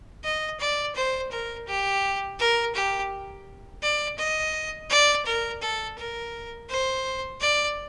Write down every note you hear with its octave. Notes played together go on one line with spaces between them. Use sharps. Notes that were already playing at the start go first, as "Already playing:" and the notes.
D#5
D5
C5
A#4
G4
A#4
G4
D5
D#5
D5
A#4
A4
A#4
C5
D5